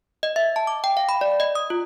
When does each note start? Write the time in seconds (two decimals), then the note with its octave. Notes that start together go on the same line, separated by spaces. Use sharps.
0.23 D#5
0.36 E5
0.56 A5
0.67 D6
0.84 G5
0.97 F5
1.09 B5
1.21 D5
1.40 D#5
1.55 D#6
1.70 F4